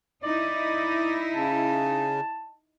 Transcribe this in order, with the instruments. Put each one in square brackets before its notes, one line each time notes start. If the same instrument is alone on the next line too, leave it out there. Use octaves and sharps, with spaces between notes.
[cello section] D#4 E4 [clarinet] D5
[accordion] C#3 [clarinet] A5